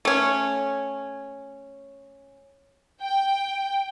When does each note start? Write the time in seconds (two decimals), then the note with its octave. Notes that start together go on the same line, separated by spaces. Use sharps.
0.05 A3 C#4
3.02 G5